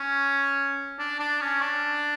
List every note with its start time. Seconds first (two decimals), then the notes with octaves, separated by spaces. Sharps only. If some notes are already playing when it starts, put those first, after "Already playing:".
Already playing: C#4
0.99 D4
1.20 D4
1.41 C#4
1.62 D4